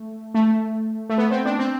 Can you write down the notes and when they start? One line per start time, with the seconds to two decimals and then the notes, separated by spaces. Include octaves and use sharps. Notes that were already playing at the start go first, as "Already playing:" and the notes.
Already playing: A3
0.35 A3
1.10 A3
1.18 B3
1.31 C4
1.45 D4
1.59 C4